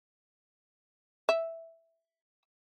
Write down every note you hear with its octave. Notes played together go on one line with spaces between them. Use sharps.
E5